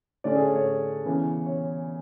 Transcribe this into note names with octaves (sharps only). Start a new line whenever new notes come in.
D3 A3 C#4 D5
G#4
C#5
C#5
C#3 E3 B3
C#5